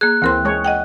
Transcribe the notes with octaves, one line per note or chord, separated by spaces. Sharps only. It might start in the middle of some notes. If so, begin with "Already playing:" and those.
A#3 G#4 F#6
D2 E3 C4 A#4 C6
G#3 C#5
D#5 F#5 G5